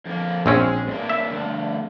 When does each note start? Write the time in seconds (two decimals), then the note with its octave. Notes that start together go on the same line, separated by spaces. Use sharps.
0.05 F2 A#3
0.46 A#1 G#3 C4 C#4
0.87 G2 A#3
1.09 E5
1.31 D2 G2